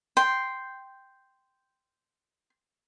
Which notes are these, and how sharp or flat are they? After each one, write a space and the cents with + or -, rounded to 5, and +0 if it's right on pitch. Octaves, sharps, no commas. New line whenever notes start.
G5 +0 C6 -5